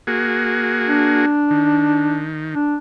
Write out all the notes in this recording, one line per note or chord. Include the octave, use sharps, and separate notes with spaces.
A#3 F#4 G#4
D4
D#3
D4